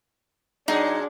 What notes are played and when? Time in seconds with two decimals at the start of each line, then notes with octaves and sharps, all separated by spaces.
0.68 A#2 F#3 D4 D#4 G#4